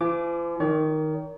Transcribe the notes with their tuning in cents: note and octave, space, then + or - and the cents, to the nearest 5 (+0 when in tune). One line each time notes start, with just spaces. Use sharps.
F3 -45 D6 +0
D#3 +0 C#5 +45